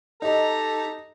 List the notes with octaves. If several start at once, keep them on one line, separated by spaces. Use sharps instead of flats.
D#4 G4 A4 D#5 A#5